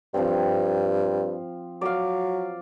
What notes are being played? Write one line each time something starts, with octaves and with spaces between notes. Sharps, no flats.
G2 F3 C4
F#3 D5 F5